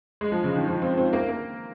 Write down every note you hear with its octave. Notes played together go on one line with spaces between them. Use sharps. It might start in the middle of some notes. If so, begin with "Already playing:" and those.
G#3
F3
C#3
D#3
F3
C4
C4
A#3
A#3